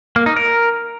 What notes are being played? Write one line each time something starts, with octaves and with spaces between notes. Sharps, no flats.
A#3
D#4
A#4